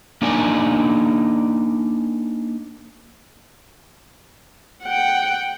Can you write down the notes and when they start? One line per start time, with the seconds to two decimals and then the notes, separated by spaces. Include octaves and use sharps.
0.22 A#3 D4 D#4 A#4 D5 G#5
4.83 F#5 G5